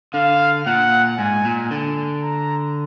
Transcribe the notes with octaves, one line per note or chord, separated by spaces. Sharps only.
D3 F5
A#2 F#5
G#2 G#5
A#2
D3
A#5